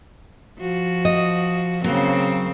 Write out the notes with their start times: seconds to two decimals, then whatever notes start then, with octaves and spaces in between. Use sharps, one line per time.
0.58 F3 F#4
1.05 D#5
1.84 C#3 F#3 A#3 C4